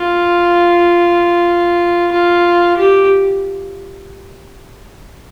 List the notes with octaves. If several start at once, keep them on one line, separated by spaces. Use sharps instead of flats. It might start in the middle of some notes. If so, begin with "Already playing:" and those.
Already playing: F4
F4
G4